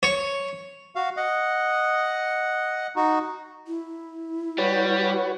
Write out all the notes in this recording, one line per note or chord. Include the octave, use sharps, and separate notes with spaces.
C#5
F#4 F5
D#5 F#5
D#4 F#4
E4
G3 F#4 B4 C#5